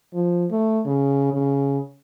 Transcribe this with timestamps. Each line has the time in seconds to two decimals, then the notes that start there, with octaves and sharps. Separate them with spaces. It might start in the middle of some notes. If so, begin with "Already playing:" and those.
0.13 F3
0.51 A3
0.86 C#3
1.33 C#3